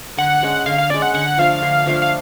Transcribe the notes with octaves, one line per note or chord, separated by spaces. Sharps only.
D3 F#5
G#3 C#4
D3 F5
F5
G#3 C#4 D5
F#5
D3 F#5
F3 A3 D4 F5
D3
F3 A3 D4
F5